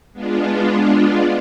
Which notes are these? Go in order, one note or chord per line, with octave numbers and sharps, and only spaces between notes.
G#3 B3 D4 F4